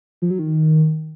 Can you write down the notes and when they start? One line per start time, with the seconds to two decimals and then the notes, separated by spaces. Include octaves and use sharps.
0.22 F3
0.30 F#3
0.39 D#3